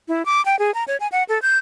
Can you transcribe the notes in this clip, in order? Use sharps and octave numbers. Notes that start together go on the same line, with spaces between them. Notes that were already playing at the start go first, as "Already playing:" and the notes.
E4
D6
G5
G#4
A#5
C#5
G#5
F#5
A4
G6